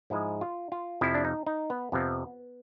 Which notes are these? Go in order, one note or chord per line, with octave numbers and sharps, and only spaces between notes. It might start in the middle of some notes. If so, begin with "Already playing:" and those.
G#2 F3 G#3 E4
F4
F4
F2 C3 F3 E4
D4
D#4
D#4
B3
F2 C3 F3 B3